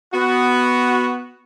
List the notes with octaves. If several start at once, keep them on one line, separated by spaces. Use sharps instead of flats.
B3 F#4